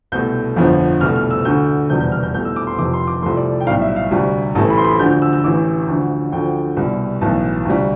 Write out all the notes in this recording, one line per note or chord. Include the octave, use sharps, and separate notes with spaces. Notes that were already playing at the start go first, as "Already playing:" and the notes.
C2 B2 A3 G6
G1 F2 D3 F3
C2 B2 A3 F6
F6
E6
D2 D3 A3 G6
F1 E2 B2 G3 G6
G6
F6
G6
C2 B2 A3 G6
E6
D6
C6
F1 F2 C3 D6
C6
D6
C2 C3 F3 A3 C6
D5
G5
B1 A2 G3 F5
E5
F5
D2 C3 G3
A1 A2 E3 A3 A5
B5
C6
B5
D2 D3 F3 G6
G6
E6
E6
A1 A2 E3 D6
D2 D3 F3
D2 D3 F3 A3 G5
C2 B2 G3
B1 A2 E3 A5
D2 C3 G3